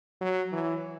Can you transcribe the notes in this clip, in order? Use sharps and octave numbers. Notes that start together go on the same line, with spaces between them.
F#3
E3